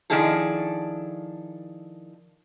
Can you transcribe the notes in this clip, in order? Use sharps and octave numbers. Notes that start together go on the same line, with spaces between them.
D#3 F3 D4 E4 G#4 A4